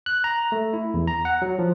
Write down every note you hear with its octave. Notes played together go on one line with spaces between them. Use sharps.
F#6
A#5
A3
E4
E2
A#5
F#5
F#3
F3